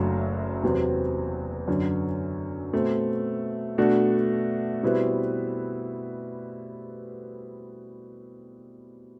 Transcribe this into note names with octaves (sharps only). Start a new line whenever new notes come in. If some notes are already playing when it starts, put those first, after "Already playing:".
Already playing: F#1 F#2 F#3 A3 D4
E2 C3 F#3 C4
F#2 D3 F#3
B2 A3 C4
B2 A3 D4 F#4
B2 G3 C4 E4 B4